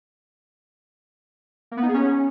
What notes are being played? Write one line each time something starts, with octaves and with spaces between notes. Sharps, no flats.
A#3
B3
D#4
G#4
C#4